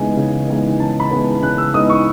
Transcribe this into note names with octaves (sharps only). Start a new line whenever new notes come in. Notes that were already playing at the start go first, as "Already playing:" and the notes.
Already playing: C#3 E3 G#3 B3 D#4 G#5
C#3
E3 G#3 B3 D#4
C#3 A5
B5
E3 G#3 B3 D#4
C#3 F#6
E6
E3 G#3 B3 D#4 D#6
C#6